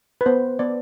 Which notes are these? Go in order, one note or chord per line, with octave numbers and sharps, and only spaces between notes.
B4
B3 C5
B3 D5